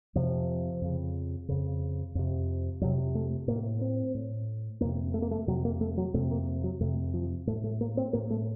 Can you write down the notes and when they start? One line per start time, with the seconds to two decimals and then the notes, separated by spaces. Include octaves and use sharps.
0.15 F2 C3 F3
0.81 F2 C#3
1.49 F2 C#3
2.15 F2 C3
2.81 F2 C3 F#3
3.15 A3
3.47 A2 A#3
3.81 C4
4.15 A2
4.81 F2 C3 A#3
5.14 A3
5.22 A#3
5.31 A3
5.47 F2 C3 F#3
5.65 A#3
5.81 A3
5.98 F#3
6.14 F2 C3 A3
6.31 A#3
6.64 F#3
6.80 F2 C3 A3
7.14 F3
7.47 A2 A3
7.64 A3
7.81 A#3
7.97 C4
8.13 A2 A#3
8.30 A3